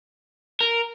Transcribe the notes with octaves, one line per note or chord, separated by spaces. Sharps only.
A#4